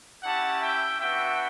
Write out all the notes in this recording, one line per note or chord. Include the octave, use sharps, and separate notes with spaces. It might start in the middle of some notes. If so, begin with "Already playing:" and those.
C#4 E4 G4 F#5 A5
E5 G5
B3 D4 F#4 E5 G5